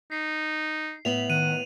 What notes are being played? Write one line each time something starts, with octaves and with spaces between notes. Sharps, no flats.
D#4 C7
A2 B3 E5 F7 F#7
D#3 F#5 D#7